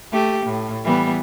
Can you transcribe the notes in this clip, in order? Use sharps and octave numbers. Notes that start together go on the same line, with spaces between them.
A3 G4
A2
E3 G3 B3